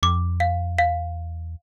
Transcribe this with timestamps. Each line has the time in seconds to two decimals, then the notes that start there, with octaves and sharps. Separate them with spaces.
0.03 F2 D6
0.40 F5
0.78 E2 F5